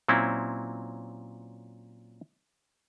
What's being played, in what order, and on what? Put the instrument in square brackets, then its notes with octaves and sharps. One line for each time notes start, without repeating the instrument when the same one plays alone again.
[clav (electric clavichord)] A#2 F#3 C4 C#4 E4